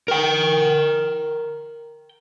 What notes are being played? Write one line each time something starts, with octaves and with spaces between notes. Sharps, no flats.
A#4 G5